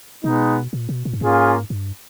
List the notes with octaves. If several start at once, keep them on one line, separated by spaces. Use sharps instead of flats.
B2 G#3 B3 D#4
A#2
B2
A#2
G2
G#2 A#3 C#4 F4 G#4
G2